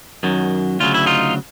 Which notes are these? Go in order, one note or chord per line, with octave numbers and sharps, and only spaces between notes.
F#2 D#3 F#3
D2 C#3 F#3 F4
E4
D#4 F4